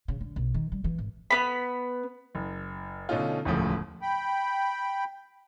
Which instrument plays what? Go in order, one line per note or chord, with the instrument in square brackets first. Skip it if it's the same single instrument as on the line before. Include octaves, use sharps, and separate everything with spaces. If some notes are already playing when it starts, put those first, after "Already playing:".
[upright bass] C#3
D3
B1
D#3
G3
E3
G#1
[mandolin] B3 B5
[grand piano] F#1
B2 D3 A3 C#4 D#4 F4
E1 D2 A2 C#3 F3
[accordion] G5 B5